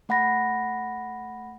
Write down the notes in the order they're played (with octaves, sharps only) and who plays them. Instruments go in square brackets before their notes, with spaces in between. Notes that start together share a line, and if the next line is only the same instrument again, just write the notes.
[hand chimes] A3 F#5 B5 A#6